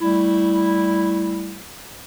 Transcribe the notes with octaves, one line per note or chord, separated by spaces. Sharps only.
G3 A3 E4